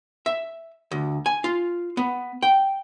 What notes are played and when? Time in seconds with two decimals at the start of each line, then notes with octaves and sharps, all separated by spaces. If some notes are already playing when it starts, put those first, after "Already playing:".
0.26 E5
0.91 D2
1.26 G#5
1.44 F4
1.97 B3
2.42 G5